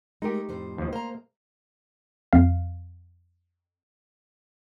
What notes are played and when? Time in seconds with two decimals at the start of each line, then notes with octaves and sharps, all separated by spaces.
0.22 G#3 A3 D#4 G4 A#4
0.49 F2 A2 C5
0.78 D#2 F3
0.93 A#3 C5 A#5
2.33 F2 F5